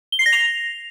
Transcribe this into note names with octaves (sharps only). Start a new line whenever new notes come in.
G7
C7
A#6
F7